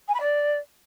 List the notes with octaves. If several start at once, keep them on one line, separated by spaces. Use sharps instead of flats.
G#5
B5
D5